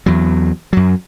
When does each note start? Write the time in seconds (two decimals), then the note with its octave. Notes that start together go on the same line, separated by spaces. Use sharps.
0.06 E2 F#3
0.73 F#2 F#3